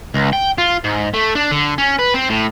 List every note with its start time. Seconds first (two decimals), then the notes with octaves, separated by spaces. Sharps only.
0.14 C#2
0.33 G5
0.58 F4
0.84 G#2
1.14 A3
1.35 D4
1.51 D3
1.78 C#4
1.99 B4
2.14 C4
2.29 A2